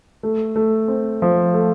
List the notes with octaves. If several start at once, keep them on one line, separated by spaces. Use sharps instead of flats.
A3
A3
C4
F3
A3